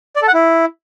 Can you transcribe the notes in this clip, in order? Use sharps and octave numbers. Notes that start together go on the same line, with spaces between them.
D5
A4
F#5
E4